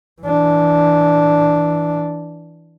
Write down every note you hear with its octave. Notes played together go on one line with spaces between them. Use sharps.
E3 D4